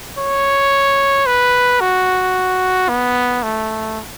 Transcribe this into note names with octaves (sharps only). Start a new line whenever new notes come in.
C#5
B4
F#4
B3
A3